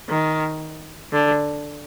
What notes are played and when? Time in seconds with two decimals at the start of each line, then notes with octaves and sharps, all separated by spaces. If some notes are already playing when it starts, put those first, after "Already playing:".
0.09 D#3
1.13 D3